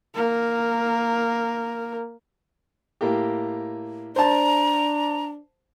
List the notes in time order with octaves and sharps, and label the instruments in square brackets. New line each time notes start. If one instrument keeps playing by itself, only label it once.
[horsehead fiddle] A#3 A#4
[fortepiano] A2 A#3 G4
[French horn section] D4 [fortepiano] C5 A5 [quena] A#5